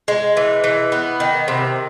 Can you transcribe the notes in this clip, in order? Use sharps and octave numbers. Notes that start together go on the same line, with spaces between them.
G#3
E3
E3
B3
D#3
C3